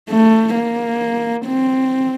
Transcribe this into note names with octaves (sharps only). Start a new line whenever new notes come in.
A3
A#3
C4